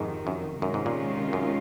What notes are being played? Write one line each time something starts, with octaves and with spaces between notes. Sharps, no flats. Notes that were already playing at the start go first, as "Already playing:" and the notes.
Already playing: F2 G#2 C3 D#3
F#2
F#2 C3 D#3 G#3 C#4 F4
G#2
A#2
F#2